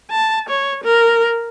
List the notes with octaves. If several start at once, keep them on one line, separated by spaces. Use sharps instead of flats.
A5
C#5
A#4